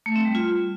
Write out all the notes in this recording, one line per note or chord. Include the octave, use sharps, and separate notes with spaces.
A3
C4
G3
F4